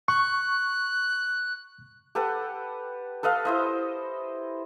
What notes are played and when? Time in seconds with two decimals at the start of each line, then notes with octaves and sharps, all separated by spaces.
0.08 C#6 F#6
2.15 G4 A4 B4 F#5
3.23 A4 B4 D#5 F5
3.45 E4 C5 D#5